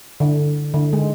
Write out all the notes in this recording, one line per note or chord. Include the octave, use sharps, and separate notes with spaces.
D3
D3
G#3